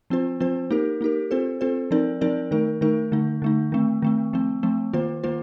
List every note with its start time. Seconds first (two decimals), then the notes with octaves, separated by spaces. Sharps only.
0.10 F3 C4 F4 C5
0.40 F3 C4 F4 C5
0.71 A#3 D#4 G4 A#4
1.01 A#3 D#4 G4 A#4
1.31 C4 F4 A4 C5
1.61 C4 F4 A4 C5
1.91 F3 C4 D#4 A#4 D5
2.21 F3 C4 D#4 A#4 D5
2.51 D#3 A3 D#4 A#4
2.81 D#3 A3 D#4 A#4
3.12 D3 A3 D#4
3.42 D3 A3 D#4
3.72 D#3 A3 C4
4.02 D#3 A3 C4
4.33 F3 A3 C4
4.63 F3 A3 C4
4.93 D#3 A#3 F4 C5
5.23 D#3 A#3 F4 C5